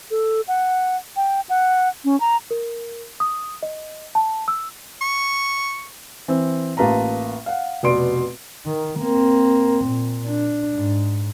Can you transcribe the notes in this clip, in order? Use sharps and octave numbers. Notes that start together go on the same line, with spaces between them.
A4
F#5
G5
F#5
C#4
A#5
A#4
D#6
D#5
A5
E6
C#6
E3 C4
A1 A#3 F4 B4 A5 A#5
F5 F#5
F1 B2 D5 C6 D7
D#3
A#3 C4
A#2
D4
G#2